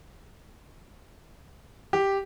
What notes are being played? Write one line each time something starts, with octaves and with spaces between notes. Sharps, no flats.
G4